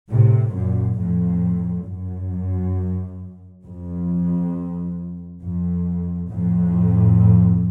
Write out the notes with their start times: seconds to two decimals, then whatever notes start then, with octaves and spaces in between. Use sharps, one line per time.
0.11 A2 C3
0.55 F#2 A#2
1.00 F2 A2
1.88 F#2
3.65 F2
5.42 F2
6.30 F2 A2